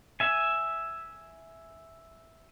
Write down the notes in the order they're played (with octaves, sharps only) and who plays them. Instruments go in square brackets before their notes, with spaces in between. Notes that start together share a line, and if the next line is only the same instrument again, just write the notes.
[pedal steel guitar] E5 G#5